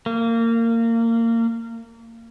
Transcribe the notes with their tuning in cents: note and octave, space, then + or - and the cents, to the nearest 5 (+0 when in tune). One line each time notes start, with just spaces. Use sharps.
A#3 -25